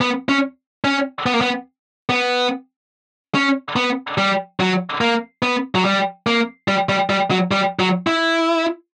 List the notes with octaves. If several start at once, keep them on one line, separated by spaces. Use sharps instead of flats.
B3
C#4
C#4
B3
A#3
B3
B3
C#4
B3
G3
F#3
A#3
B3
F#3
G3
A#3
G3
G3
G3
F#3
G3
F#3
E4